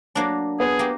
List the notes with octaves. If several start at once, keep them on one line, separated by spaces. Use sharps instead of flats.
F#3 A#3 D4
B3 G#4
A#3 G4